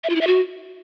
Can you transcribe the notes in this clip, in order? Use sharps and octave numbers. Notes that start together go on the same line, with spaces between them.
E5
F4
E4
E5
F#4